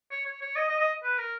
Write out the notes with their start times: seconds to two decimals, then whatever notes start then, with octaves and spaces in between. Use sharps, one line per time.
0.11 C#5
0.26 C#5
0.41 C#5
0.56 D#5
0.69 D#5
0.79 D#5
1.03 B4
1.18 A#4